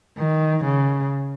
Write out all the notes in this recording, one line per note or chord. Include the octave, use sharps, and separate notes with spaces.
D#3
C#3